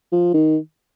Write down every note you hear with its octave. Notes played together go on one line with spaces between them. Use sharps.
F3
D#3